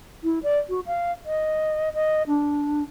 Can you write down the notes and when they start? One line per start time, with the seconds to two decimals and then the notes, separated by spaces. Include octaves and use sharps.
0.24 E4
0.43 D5
0.69 F#4
0.86 F5
1.26 D#5
1.94 D#5
2.28 D4